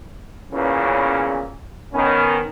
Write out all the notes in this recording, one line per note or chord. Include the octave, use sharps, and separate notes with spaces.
E2 A#2 C#3 E3 B3 C#4
D#3 B3 C#4